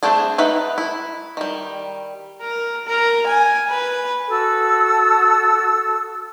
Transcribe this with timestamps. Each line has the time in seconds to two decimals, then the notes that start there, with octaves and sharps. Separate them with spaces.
0.03 G3 A3 C4 D4 G#4
0.38 D#4 B4 E5 F#5
0.78 E4
1.37 D#3 G3
2.41 A#4
2.88 A#4
3.27 G#5
3.70 B4
4.29 F#4 A4 D#6 E6